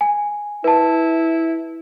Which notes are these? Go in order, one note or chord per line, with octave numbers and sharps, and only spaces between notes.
G#5
E4 B4 A5